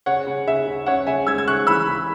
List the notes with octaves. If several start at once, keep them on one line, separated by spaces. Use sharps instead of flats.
C#3 C#5 F#5
C#3
C#3 E5
C#3
C#4 C#5 F#5
C#3 E5 G#5
G#3 E6 G#6
G#6
C#3 C#6 F#6
E3 B5 E6
C#3